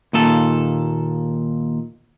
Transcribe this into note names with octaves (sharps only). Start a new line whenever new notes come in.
D#2 A#2 A4